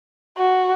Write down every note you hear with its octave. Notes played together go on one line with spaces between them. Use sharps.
F#4